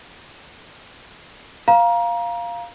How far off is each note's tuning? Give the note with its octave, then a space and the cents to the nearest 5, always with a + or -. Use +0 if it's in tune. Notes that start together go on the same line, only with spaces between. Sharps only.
F5 +0 A#5 +25